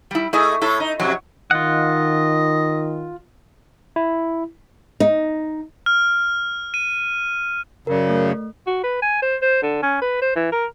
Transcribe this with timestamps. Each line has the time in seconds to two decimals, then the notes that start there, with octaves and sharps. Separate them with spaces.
0.11 G3 E4
0.33 A3 E4 G#4 D#5
0.62 A2 E4 A4
0.80 D#4
1.00 F2 C3 F#3
1.51 D#3 F4 D#5 F#5
3.96 E4
5.00 D#4
5.86 F6
6.74 D#7
7.87 F#2 C#3 A#4 D5
8.09 A3
8.67 F#4
8.84 B4
9.02 G#5
9.22 C5
9.42 C5
9.62 D3
9.83 C#4
10.02 B4
10.22 C5
10.36 E3
10.52 A#4